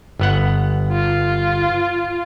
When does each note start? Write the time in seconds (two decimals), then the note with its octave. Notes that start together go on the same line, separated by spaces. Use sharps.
0.19 G1 B3 F#5
0.92 F4